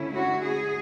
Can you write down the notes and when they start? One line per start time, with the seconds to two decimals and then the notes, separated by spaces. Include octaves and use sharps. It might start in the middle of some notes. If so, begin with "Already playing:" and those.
Already playing: D3 A3 C#4 E4
0.14 F#4
0.43 G#4